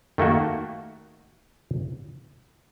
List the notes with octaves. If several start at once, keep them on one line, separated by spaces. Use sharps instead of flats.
D#3 A3 A#3 F#4